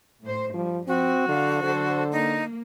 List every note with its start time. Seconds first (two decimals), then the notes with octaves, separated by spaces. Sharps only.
0.23 A2 C5
0.54 G2 F3 G3
0.88 F3 C4 F#4
1.28 D3 F#3 A4 F5
1.63 D3 A4 C5
2.12 A#3 D#4